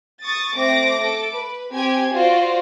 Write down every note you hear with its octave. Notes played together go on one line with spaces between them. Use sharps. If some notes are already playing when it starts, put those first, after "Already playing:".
C#6 D#6 A6
A3 C4 D6 A#6
A4 D6
B4
C4 G4 G#5 G#6
F4 F#4 C5 D5